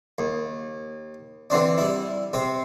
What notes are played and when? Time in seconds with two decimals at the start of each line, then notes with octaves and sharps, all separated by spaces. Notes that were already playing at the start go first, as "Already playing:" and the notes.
0.18 D#2
1.50 D3 E3 C4 D4
1.78 G3 E4
2.33 C3 C4